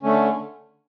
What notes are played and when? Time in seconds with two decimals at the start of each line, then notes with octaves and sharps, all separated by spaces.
0.03 D3 A3 C#4